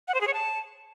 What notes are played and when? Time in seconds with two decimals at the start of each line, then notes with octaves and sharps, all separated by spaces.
0.08 F#5
0.14 C5
0.21 G#4
0.27 C#5
0.34 A5